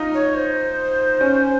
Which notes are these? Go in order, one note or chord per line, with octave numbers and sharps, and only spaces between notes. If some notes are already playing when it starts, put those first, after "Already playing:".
Already playing: D#4 F4
C#5
C5
C#4